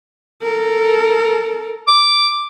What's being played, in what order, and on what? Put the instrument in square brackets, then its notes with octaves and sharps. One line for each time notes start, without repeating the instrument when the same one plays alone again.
[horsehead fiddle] A4 A#4
[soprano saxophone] D6